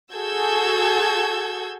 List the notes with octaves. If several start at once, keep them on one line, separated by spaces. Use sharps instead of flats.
F#4 G#4 A4 E6 G6 G#6